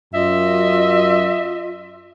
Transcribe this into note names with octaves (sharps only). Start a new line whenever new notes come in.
F#2 F4 D#5 E5